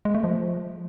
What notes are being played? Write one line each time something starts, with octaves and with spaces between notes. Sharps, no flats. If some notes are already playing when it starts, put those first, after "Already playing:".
G#3
A3
F3